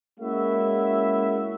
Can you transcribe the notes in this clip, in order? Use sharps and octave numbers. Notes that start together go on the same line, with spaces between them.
G#3 A#3 C#4 E4 F#4 E5